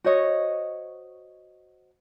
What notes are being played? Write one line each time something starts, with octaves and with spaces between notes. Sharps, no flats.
F#4 C5 C#5 D#5